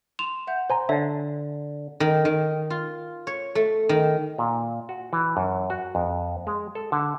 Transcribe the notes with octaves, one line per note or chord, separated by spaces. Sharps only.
C6 E7 F7
E5 F#5 G6
C5 G#5 A#5 C6
D3 C#5 E5 A5
D#3
D#3
F4
C#5
A3
D#3
A#2
F#4
E3
F#2
F#4
F2
G#3
A4
D3